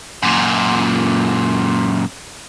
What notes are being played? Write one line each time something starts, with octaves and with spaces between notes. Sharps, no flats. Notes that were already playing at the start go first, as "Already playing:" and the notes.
F#2 A#2